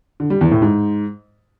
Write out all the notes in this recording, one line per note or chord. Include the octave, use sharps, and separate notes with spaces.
D3
G3
E2
A2
G#2